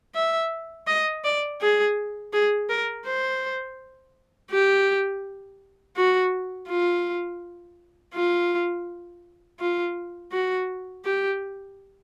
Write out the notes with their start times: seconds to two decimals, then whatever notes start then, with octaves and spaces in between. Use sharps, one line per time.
0.15 E5
0.87 D#5
1.24 D5
1.61 G#4
2.33 G#4
2.69 A#4
3.05 C5
4.51 G4
5.96 F#4
6.69 F4
8.14 F4
9.60 F4
10.32 F#4
11.04 G4